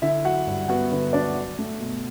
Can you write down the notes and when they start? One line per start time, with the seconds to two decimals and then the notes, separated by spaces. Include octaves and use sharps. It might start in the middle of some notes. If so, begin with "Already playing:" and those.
0.02 D3 E4 E5
0.25 F#3 F#4 F#5
0.47 G2
0.68 B3 F#4 F#5
0.91 D3 B4
1.13 F#3 D4 D5
1.35 F#3
1.59 A3
1.80 B2